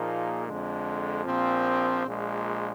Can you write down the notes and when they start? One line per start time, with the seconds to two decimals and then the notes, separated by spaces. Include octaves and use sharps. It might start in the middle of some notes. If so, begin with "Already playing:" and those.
Already playing: A#2 F3 A#3 D#4 G#4
0.46 F2 D3 G#3
1.25 A#1 A#2 F3 C4
2.06 A#1 A#2 G#3